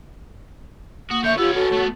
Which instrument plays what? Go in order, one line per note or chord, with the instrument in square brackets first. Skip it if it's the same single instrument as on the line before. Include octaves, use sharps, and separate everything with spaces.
[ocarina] A#3 [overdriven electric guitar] F#4 [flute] D#6
[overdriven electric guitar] D3 C#5 [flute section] E5 C#6 [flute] G6
[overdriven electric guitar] B3 C#4 [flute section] F4 [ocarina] G4 [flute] E6
[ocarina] F#4 [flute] A4 [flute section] C#5 F#5
[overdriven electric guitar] A3 B3